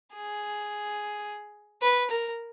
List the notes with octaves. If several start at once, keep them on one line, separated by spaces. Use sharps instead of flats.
G#4
B4
A#4